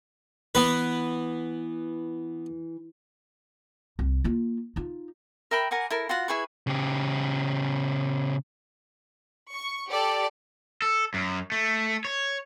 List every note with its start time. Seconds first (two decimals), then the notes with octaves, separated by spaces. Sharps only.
0.55 E3 B3 B4
3.99 C2
4.24 A#3 F4
4.76 D#4 F4
5.51 A#4 E5 G5 B5
5.71 A#4 F#5 G#5 D6
5.90 E4 A4 A#4
6.09 F4 F#4 F#5
6.28 E4 G#4 B4 C#6
6.67 C#3 G4
9.52 C#6
9.91 G4 A4 D5
10.82 A4
11.14 F#2
11.52 A3
12.05 C#5